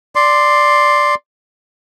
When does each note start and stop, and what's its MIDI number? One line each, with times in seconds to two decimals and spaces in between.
0.15 1.15 74
0.15 1.15 84